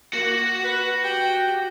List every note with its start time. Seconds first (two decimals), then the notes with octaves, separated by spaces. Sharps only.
0.13 A#3 F#4 F#5
0.63 B4
1.03 G4 G5